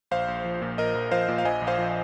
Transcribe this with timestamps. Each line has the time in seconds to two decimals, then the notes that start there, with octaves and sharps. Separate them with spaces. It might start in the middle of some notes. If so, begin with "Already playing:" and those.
0.11 A#1 C5 F5
0.28 A#1
0.45 F3
0.62 A#2
0.78 A#1 A#4 D#5
0.95 A#1
1.11 F3 C5 F5
1.28 A#2
1.38 F5
1.45 A#1 D#5 G#5
1.61 A#1
1.67 C5 F5
1.78 F3